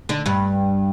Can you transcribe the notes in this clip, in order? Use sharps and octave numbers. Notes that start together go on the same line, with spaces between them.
D3 D4
G2 G3